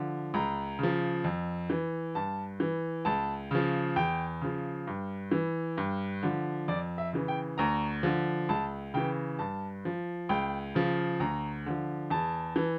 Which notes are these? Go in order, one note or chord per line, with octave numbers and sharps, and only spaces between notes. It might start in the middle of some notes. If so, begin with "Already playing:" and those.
Already playing: D3 F3
C#2 A#5
C#3 F3
F2
E3
G2 A5
E3
C#2 A5
C#3 F3
E2 G5
C#3 F3
G2
E3
G2
D3 F3
F2 D5
E5
C#3 E3
G5
D2 A#5
D3 F3
C#2 A5
C#3 E3 G5
G2 A5
F3
C#2 G5
C#3 F3
D2 A#5
D3 F3
E2 A5
E3